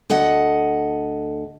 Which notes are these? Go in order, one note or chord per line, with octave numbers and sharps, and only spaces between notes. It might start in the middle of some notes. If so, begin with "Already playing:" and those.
D2 A4 D#5 F#5